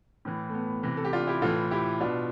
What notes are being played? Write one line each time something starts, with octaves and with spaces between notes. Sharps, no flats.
A2 E3
A3
B3
C3 E3
A4
G4
D4 F4
E4 G4
A2 E3 F4 A4
E4 G4
B2 D4 F4